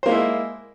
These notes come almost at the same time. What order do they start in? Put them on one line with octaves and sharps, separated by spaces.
C5 A#3 G#3 E4